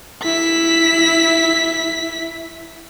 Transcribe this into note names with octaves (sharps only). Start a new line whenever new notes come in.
E4 B6